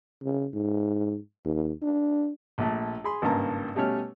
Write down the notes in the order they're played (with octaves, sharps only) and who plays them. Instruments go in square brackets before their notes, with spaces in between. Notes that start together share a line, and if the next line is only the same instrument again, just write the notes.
[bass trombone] C#3
G#2
D#2
D4
[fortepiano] A#1 A#2 A3
G#4 G#5 B5 C6
G#1 G2 C#3 A#3 A5 A#5
B2 G3 A3 C#4 C#5 F6